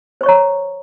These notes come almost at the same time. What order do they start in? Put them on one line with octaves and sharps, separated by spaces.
C5 C#6 C#5 A#5